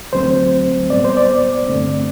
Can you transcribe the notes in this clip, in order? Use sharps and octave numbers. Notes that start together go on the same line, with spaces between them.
D2 D3 F#3 A3 C4 C5
A2 G3 B3 D5
C5
D5
G2 D3 A3 C4